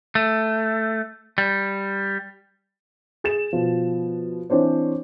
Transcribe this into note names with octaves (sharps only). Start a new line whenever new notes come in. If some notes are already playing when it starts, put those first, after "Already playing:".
A3
G3
G#4 A6 E7
B2 F3
E3 C4 D4 C5 C#5